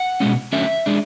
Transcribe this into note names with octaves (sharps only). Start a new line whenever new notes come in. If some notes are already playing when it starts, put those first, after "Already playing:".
Already playing: F#5
B2 G#3 C#4
D3 F#3 A3 C#4 E5
G#3 D4